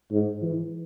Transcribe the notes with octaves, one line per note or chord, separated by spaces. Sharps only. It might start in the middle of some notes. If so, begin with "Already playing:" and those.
G#2
E3